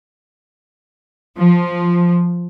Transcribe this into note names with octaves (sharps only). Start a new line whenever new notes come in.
F3